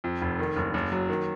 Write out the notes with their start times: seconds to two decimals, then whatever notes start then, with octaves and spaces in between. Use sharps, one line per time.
0.04 F2
0.22 F1
0.39 D#3
0.56 F#1
0.74 F#1
0.92 F#3
1.09 D#3